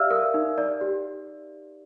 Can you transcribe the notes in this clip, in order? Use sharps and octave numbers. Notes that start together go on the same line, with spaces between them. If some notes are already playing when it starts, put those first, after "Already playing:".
Already playing: G4 D5 E5 F5 E6 F6
A#4
D#4
D5
G4